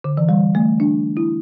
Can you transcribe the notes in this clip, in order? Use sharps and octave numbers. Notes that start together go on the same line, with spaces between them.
D3
E3
G3
A3
D4
E4